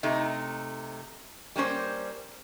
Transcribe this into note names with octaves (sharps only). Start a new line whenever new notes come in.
C3 A3 D#4
G3 A#3 C#4 C5